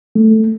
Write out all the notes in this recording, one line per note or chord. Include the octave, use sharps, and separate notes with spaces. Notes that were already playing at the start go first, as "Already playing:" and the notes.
A3